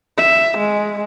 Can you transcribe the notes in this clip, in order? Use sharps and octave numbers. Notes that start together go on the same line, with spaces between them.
E5
G#3